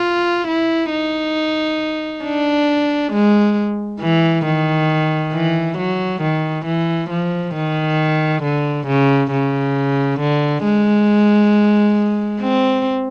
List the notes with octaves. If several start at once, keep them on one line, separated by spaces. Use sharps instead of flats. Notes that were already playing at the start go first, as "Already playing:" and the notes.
Already playing: F4
E4
D#4
D4
G#3
E3
D#3
E3
F#3
D#3
E3
F3
D#3
D3
C#3
C#3
D3
G#3
C4